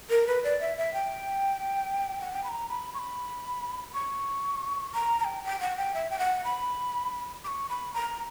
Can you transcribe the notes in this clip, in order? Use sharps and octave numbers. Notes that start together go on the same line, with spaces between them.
A#4
B4
D5
E5
E5
G5
F#5
G5
B5
A#5
B5
C#6
B5
C#6
A#5
A#5
G5
G5
F#5
G5
E5
G5
F#5
B5
D6
C#6
B5
A#5